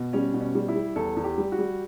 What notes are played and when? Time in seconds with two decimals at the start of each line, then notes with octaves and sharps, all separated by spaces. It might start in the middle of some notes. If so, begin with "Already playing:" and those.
Already playing: B2
0.13 G3 C#4
0.34 B2
0.41 C#4
0.55 G3
0.68 E4
0.76 G3
0.96 E2 A4
1.17 E2
1.24 G4
1.38 G3
1.52 F#4
1.59 G3